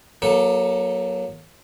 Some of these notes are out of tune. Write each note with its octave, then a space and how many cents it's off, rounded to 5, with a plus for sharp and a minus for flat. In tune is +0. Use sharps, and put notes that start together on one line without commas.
F#3 -5 A#3 +30 A4 +0